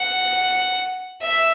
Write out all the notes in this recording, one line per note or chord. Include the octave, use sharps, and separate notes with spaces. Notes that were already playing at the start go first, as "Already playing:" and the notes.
Already playing: F#5
E5